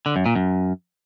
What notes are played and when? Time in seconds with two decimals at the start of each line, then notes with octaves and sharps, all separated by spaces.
0.06 D3
0.16 F#2
0.26 A#2
0.36 F#2